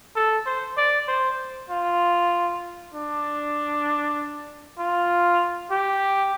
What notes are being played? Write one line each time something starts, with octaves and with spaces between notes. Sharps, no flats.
A4
C5
D5
C5
F4
D4
F4
G4